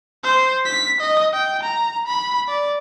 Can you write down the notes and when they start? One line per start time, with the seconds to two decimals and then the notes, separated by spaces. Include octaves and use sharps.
0.24 C5
0.66 B6
1.01 D#5
1.33 G5
1.63 A#5
2.07 B5
2.48 D5